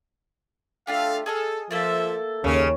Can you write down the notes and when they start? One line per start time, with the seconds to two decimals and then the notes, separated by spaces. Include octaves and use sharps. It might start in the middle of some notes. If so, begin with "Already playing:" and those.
0.87 A3 D4 F4 G4 A4 F5
1.26 G#4 A4 D#5 F6
1.71 F3 A3 A#3 A4 E5
2.44 D#2 C#3 C#4